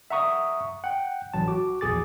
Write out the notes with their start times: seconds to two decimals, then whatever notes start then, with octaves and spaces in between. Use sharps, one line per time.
0.10 E5 F#5 A#5 C#6 D#6
0.84 F#5 G5
1.34 A1 F#3 A5
1.48 F#4 D6
1.81 A#1 E2 G#4 D6 A6